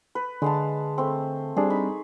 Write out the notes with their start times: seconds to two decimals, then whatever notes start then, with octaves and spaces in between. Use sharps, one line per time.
0.15 B4
0.42 D3 G#3 F5 A5
0.98 A3 C4
1.57 G3 C4 D4 G#4
1.70 D#4 B5 C#6